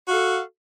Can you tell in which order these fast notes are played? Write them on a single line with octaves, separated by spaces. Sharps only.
F#4 F5 A4